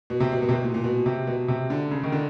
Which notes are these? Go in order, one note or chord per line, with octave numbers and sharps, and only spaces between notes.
B2
C3
B2
B2
C3
B2
A#2
A#2
B2
C3
B2
C3
D3
C#3
D#3
D3